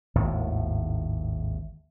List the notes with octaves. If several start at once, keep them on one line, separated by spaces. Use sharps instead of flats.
G#1 D#2 A2